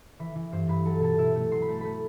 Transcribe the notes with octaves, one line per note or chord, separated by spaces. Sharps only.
E3 B4
E3
G2 C5
G2 B4 B5
F#3 A4 A5
B2 A4 A5
B2 E4 E5
A3
F#3 C6
B5
A3 A5
A3 B4 B5